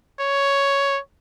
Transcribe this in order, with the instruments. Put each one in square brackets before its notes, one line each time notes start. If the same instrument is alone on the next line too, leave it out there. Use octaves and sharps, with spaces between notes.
[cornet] C#5